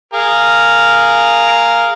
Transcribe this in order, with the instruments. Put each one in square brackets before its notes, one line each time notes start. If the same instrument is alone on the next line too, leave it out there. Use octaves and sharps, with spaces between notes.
[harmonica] G#4 A#4 F5